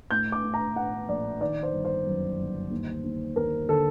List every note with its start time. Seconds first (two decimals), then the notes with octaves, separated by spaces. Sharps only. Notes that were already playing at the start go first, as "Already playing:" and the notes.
0.11 A2 G6
0.32 D6
0.44 A2
0.54 A#5
0.75 A2 F#5
1.09 A#1 D5
1.41 D#3 D5
1.63 C5
1.73 G1
1.85 C5
2.07 F#2
2.39 G1
2.71 D#2
3.04 D#2
3.36 D#2 A#4
3.69 D3 A4